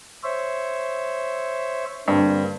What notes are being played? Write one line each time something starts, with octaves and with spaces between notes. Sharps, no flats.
C5 C#5 E5
G2 D3 A#3 C4